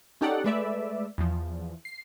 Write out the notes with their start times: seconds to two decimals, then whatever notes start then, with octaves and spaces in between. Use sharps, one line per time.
0.21 C#4 D#4 G4 A4 D5 F#5
0.44 G#3 A3 B4 D5 E5
1.18 E2 F3
1.85 C7